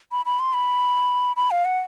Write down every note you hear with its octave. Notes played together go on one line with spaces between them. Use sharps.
B5
B5
C6
B5
B5
F5
F#5